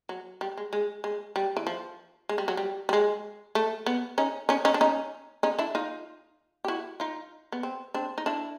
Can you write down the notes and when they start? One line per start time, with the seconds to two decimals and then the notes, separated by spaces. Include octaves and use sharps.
0.09 F#3
0.41 G3
0.57 G#3
0.73 G#3
1.04 G#3
1.36 G3
1.57 E3
1.67 F3
2.29 G#3
2.38 G3
2.48 F#3
2.57 G3
2.89 G3
2.93 G#3
3.55 A3
3.86 B3
4.18 C#4 D#4
4.49 C#4 D#4
4.65 C#4 D#4
4.74 D4
4.81 C#4 D#4
5.43 C#4 D#4
5.59 D4 E4
5.75 D#4 F4
6.65 G4
6.68 E4 F#4
7.00 D#4 F4
7.52 B3
7.63 C4
7.94 C4 D4
8.18 D#4
8.26 D4 E4